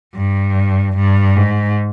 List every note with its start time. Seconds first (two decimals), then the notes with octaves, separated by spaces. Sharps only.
0.14 G2
0.96 G2
1.37 G#2